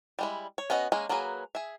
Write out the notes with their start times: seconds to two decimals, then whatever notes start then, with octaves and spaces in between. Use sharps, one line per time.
0.19 G3 G#3 E4
0.58 C#5
0.70 B3 C#4 F#4 B4 D#5
0.92 G#3 A#3 C#4 G#4
1.09 F#3 A#3 F#4 G#4 B4
1.55 G#4 E5